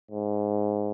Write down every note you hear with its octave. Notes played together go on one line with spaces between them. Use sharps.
G#2